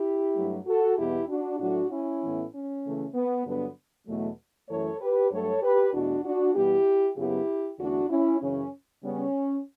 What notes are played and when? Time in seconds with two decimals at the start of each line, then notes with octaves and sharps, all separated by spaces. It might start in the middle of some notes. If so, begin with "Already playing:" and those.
Already playing: E4 G4
0.35 G2 F#3 A3
0.66 F#4 A4
0.97 E2 B2 G3 B3 E4 G4
1.28 D4 F#4
1.59 A2 F#3 A3 D4 F#4
1.90 C#4 E4
2.22 A2 E3 B3
2.52 C#4
2.84 C#3 E3 A3
3.14 B3
3.45 G2 D3 F#3 B3
4.06 E2 B2 F#3 A3
4.68 F#2 E3 A3 A4 C#5
5.00 G4 B4
5.30 G2 F#3 A3 A4 C#5
5.62 G4 B4
5.93 E2 B2 A3 D4 F#4
6.24 D4 F#4
6.54 E2 B2 G3 B3 E4 G4
7.16 F#2 C#3 F#3 B3 E4 G4
7.78 E2 D3 A3 D4 F#4
8.09 C#4 E4
8.40 F#2 C#3 E3 C#4
9.02 C#3 G3 B3 C#4